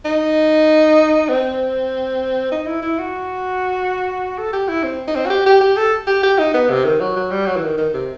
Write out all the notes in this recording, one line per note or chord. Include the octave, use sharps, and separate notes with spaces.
D#4
C4
D#4
E4
E4
F#4
A4
G4
E4
C4
D#4
C4
F#4
G4
G4
G4
A4
G4
G4
D#4
B3
C3
D#3
F#3
F#3
G3
F#3
E3
D#3
D#3
C3